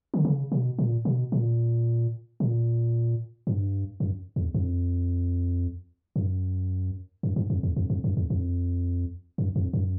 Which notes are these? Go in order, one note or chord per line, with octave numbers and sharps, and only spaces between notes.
D3
C#3
B2
A#2
B2
A#2
A#2
G2
F#2
E2
F2
F#2
F#2
G2
F2
E2
F2
F2
F#2
E2
F2
F#2
F2
F#2